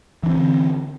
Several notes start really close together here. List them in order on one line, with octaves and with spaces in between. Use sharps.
E3 D4 C4 D3